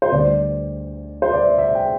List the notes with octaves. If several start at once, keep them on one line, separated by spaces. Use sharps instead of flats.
C5
D2 D3 G3 D5
C5
D5
E5
E5
G5